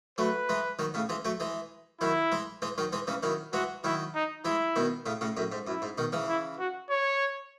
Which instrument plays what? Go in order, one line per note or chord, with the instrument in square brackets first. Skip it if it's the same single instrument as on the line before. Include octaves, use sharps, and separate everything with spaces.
[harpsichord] F#3 A3 [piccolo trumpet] B4
[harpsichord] E3 G#3
D#3 F#3
A2 C#3
E3 G#3
F#3 A3
E3 G#3
[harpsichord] D#3 F#3 [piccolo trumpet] E4
[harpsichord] E3 G#3
E3 G#3
D#3 F#3
E3 G#3
C#3 E3
[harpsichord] D#3 F#3 [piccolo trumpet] E4
[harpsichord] E3 G#3 [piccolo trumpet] F#4
[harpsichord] D#3 F#3 [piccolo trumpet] E4
[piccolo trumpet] D#4
[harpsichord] E3 G#3 [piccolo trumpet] E4
[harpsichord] B2 D#3
A2 C#3
A2 C#3
F#2 A2
G#2
[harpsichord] F#2 [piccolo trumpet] E4
[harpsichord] G#2
B2 D#3
C#3 E3
[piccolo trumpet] E4
F#4
C#5